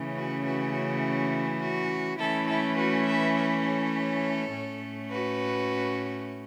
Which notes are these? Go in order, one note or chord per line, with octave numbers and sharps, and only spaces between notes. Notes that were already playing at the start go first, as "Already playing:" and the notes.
Already playing: C#3 E3 A3 C#4
F#4 B4
F#4 B4
F#4
F#4
E3 A3 C#4 E4 A4
E4 A4
F#4 B4
B4 E5
B4 E5
A4 C#5
A2 A3 C#4
F#4 B4